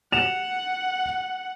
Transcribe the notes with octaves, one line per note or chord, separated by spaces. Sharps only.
F#5 E7 F7